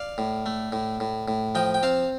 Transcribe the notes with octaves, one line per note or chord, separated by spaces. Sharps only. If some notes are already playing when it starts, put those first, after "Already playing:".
Already playing: D5 F5
A2
A3
A2
A2
A2
F3 D#5 G5
G5
C4 F5 A5